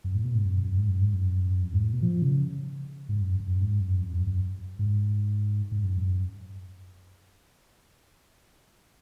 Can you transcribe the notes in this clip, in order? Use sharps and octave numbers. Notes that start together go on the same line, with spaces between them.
F#2
A2
B2
G#2
F#2
F#2
G#2
F#2
G#2
F#2
F2
G#2
A2
B2
F3
C#3
G#2
F#2
F#2
G#2
F#2
F2
F#2
F#2
G#2
G#2
F#2
F#2